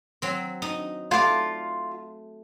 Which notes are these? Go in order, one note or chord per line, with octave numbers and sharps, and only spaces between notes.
F#3 C4
D#4
A3 F4 D5